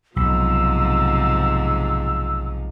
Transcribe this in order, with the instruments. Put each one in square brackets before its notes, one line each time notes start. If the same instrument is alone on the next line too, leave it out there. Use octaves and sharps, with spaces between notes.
[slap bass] B1 [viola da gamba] G#2 C3 F3 [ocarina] E6